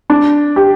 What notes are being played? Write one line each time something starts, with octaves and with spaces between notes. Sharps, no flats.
D4
G4